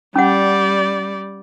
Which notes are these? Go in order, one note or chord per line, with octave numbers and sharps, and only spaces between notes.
G3 C#4 D5 F#5